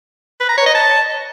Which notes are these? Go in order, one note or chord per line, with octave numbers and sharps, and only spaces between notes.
B4
A#5
C#5
D#5
A5